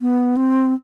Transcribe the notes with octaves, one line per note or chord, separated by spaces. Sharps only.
B3
C4